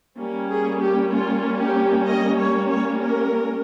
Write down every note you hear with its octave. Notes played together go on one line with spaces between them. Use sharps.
G3 A#3 C#4
G#4
G4
F4
G4
D#5
C#5
C#5
A#4